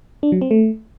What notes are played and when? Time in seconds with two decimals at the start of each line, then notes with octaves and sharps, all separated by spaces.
0.23 D4
0.32 F#3
0.41 C4
0.51 A3